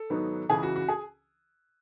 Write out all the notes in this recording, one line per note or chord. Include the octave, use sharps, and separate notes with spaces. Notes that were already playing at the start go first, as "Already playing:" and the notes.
Already playing: A4
G#2 D#3 F#3 B3 D#4
C#2 C#3 E3 G#4
F#4
F#4
G#4